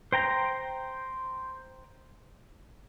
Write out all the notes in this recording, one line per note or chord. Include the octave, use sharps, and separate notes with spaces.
C5 G5 A#5